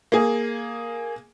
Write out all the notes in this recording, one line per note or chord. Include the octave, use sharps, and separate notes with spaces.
A#3 G#4